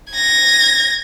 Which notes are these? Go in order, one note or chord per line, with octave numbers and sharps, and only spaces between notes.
G#6 A#6